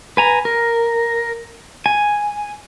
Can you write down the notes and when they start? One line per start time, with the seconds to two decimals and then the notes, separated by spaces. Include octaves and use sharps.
0.17 B4 G#5 A#5
0.45 A#4
1.86 G#5